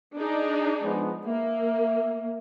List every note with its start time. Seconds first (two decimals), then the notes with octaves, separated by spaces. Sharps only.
0.16 D4 D#4 G#4
0.82 F3 G#3 B3
1.27 A#3 E5